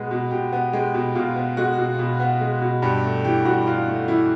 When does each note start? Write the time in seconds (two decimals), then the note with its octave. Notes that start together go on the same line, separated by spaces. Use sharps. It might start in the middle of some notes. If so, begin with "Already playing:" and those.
Already playing: B2 G#3 B3
0.11 B2
0.31 B2 G4
0.52 B3
0.73 G#3 G4
0.94 B2
1.15 B2 F4
1.36 B3
1.57 G#3 F#4
1.78 B2
1.99 B2
2.20 B3
2.41 G#3
2.62 B2
2.82 G2 G4
3.03 A3
3.25 E3 G4
3.45 G2 F#4
3.67 G2 F4
3.87 A3
4.08 E3 E4